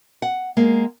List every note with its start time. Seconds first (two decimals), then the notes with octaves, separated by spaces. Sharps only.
0.22 F#5
0.57 G#3 A#3